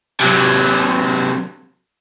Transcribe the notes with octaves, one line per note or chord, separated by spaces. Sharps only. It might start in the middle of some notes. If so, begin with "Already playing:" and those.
C3 F#3